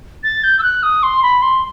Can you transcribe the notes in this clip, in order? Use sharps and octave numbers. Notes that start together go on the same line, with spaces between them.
A6
G6
E6
F#6
D#6
C6
B5
C6